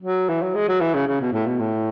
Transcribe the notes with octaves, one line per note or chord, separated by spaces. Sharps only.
F#3
E3
F#3
G#3
F#3
E3
C#3
C#3
B2
A2
B2
A2